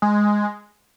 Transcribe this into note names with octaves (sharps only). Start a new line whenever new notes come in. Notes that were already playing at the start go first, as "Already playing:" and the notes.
G#3